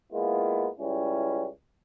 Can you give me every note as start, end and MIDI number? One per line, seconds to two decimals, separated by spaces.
0.12 0.68 56
0.12 0.68 58
0.12 0.68 59
0.12 0.68 64
0.12 0.68 65
0.78 1.46 37
0.78 1.46 55
0.78 1.46 61
0.78 1.46 64